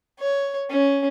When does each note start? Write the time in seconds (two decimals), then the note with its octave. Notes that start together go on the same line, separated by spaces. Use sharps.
0.19 C#5
0.70 C#4